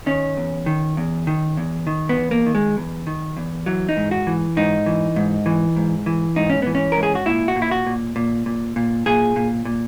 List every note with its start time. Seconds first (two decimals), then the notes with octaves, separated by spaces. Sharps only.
0.06 D#3 C#4
0.37 E2
0.66 D#3
0.97 E2
1.27 D#3
1.57 E2
1.87 D#3
2.09 B3
2.17 E2
2.31 A#3
2.46 D#3
2.55 G#3
2.77 E2
3.07 D#3
3.37 E2
3.66 E3 F#3
3.89 D#4
3.97 G#2
4.11 F#4
4.27 E3
4.57 G#2 D#4
4.86 E3
5.16 G#2
5.46 E3
5.76 G#2
6.06 E3
6.36 G#2 D#4
6.50 C#4
6.62 E3 B3
6.75 C#4
6.92 G#2 A#4
7.03 G#4
7.15 F#4
7.26 A#2 E4
7.48 F#4
7.56 A#2
7.62 E4
7.71 F#4
7.87 A#2
8.16 A#2
8.46 A#2
8.76 A#2
9.06 A#2 G#4
9.36 A#2
9.65 A#2